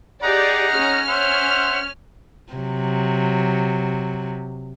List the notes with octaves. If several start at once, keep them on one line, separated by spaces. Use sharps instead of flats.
D#4 G4 G#4 D5 F#5 A#5
C#4 F6
C5 E5 F#5
C3 F#3